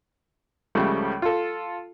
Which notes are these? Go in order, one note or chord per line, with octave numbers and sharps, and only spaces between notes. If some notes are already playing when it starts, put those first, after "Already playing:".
C#2 C#3 F3 G3 A3
F4 A4